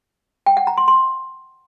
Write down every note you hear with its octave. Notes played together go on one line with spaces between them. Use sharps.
G5
F#5
A#5
C6
C6